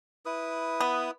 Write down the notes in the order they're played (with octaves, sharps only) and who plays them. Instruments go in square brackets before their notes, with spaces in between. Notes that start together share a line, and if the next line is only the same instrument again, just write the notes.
[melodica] E4 B4 D#6
[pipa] B3